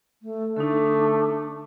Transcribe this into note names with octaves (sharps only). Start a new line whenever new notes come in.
A3
D3 A3 D4 D#4